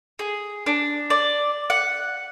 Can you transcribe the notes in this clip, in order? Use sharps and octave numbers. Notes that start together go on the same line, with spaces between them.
G#4
D4
D5
F#5